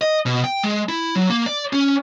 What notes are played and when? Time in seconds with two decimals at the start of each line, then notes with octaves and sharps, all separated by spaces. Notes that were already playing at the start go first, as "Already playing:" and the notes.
0.01 D#5
0.26 B2
0.44 G5
0.63 G#3
0.89 E4
1.16 F#3
1.30 A#3
1.46 D5
1.73 C#4